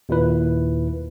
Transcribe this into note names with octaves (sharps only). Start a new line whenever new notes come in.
D#2 A#2 E4 B4